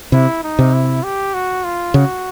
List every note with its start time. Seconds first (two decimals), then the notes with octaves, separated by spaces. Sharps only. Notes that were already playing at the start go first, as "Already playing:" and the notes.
0.12 C3 E4
0.44 D#4
0.59 C3
0.73 E4
1.03 G4
1.34 F#4
1.64 F4
1.94 C#3 F#4